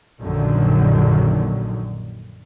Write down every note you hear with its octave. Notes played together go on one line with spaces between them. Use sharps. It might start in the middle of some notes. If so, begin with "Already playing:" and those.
A#1 F#2 A#2 D3 D#3 F#3